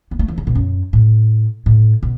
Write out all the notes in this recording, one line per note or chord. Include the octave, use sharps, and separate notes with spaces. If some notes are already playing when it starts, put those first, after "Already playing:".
B3
A3
E3
C#3
B2
F#2
A2
A2
B2